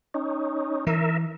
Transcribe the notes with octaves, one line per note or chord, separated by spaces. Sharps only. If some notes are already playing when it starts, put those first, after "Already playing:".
C#4 D#4
E3 A#4 E5